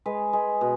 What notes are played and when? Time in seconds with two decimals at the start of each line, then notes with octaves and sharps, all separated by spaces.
0.06 G#3 B4
0.33 G#3
0.61 B2